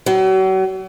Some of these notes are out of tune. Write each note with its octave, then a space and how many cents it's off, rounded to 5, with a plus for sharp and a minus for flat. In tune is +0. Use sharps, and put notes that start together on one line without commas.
F#3 +40